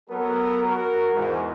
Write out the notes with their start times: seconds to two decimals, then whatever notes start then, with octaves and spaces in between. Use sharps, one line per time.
0.10 F#3 B3 A4 A#4
0.64 F#4 A#4
1.14 E2 G#2